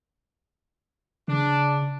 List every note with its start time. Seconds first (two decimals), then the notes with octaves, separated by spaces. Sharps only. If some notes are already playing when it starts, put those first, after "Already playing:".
1.28 C#3 D4